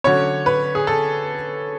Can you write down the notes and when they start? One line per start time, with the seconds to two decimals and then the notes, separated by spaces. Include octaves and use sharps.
0.04 D3 F#3 C#4 C#5
0.46 B4
0.75 G#4
0.87 A4